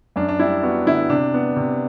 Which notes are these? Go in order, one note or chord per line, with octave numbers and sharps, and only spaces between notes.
F#2 D4
D4
G3 E4
B3 F#4
D3 E4
C3 D4
B3
C3